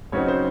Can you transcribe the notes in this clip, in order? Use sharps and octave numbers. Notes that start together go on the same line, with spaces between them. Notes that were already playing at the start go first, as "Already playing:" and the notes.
C#3 F#3 C4 D#4 C#5
C5